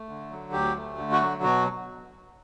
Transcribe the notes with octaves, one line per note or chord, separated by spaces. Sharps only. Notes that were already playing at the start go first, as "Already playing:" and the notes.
Already playing: A3
D3
F#3
D2 G4
A3
D3
F#4
F#3
B2 F#4